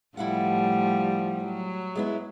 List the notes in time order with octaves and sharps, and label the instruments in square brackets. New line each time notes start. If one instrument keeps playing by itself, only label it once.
[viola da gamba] A2 F3 G3 [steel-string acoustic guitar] E4 F5 F#5
[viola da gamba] F#3
[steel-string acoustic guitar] G#3 B3 E4